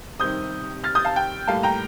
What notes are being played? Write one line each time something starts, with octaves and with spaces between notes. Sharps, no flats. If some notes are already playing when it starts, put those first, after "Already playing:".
C3 D#3 G3 C4 D#6 G6
F6 A6
D#6 G6
F5 A5
G5
A2 G3 A#3 F5 A5
G5 A#5